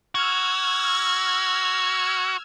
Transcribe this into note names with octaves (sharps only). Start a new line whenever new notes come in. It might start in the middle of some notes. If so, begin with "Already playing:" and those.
F#4 E6 F6 G#6